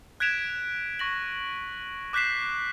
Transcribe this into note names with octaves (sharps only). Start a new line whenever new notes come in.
F#6 G#6 B6 D7 E7 F7
C#6 A#6 F#7
D6 F#6 G6 B6 C7 E7